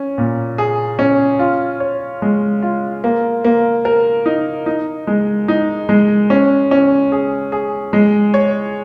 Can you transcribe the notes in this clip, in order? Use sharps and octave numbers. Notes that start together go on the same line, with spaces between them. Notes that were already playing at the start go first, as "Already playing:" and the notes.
Already playing: C#4
A#2
G#4
C#4
F4
C#5
G#3
F4
A#3
A#3
A#4
D#4
D#4
G#3
D#4
G#3
C#4
C#4
G#4
G#4
G#3
C#5